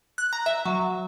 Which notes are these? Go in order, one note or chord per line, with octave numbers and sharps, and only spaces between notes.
F#6
A#5
E5
F#3